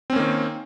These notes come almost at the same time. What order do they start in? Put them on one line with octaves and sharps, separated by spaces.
C4 C#4 A#3 D#3